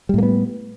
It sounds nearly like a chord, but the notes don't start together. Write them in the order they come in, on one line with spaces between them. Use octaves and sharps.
G3 A2 A#3 B3